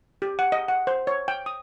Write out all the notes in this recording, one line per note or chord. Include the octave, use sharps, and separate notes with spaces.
G4
F#5
D#5
F#5
C5
C#5
G5
D#6